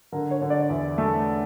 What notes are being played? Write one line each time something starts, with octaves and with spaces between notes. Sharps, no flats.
D3 A#4
C#5
D3
D5
E2 E5
A3